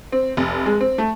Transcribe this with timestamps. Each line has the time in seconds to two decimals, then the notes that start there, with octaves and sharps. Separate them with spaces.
0.12 C4
0.37 F1
0.66 G#3
0.81 C4
0.98 A3